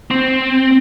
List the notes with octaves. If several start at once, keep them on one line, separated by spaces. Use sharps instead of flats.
C4